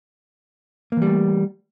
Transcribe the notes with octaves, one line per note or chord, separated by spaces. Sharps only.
E3 G3 A3 A#3